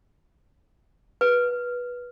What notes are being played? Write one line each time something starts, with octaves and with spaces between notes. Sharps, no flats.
B4